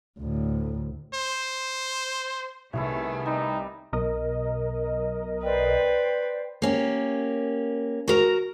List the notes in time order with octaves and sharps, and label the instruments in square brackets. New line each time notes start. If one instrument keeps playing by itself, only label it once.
[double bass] D2 A2
[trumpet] C5
[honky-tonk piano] C2 [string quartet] D#3 A3 B3 [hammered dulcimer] E4 G#4 C#5
[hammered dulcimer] G3 [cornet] D#4
[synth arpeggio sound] B1 A#4 D#5
[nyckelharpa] B4 [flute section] C5 D5 G5
[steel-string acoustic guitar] A#3 C#4 G4
F#4 A#4 A#5